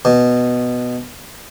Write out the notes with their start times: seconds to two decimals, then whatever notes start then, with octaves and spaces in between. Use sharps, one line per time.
0.05 B2